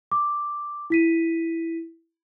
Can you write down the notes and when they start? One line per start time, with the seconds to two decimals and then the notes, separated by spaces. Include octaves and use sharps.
0.12 D6
0.90 E4 B6 D#7